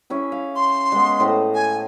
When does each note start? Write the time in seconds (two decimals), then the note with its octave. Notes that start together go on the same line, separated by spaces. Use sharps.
0.10 C#4 E4 G#4
0.32 F5
0.56 C6
0.92 G#3 B3
1.20 A2 C5 D#5
1.54 G#5